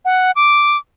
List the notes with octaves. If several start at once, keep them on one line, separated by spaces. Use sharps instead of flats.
F#5
D6